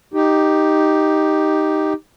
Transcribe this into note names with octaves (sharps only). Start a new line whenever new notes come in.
D#4 G4